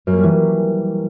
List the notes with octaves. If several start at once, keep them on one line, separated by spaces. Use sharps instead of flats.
F#2
A#3
G3
E3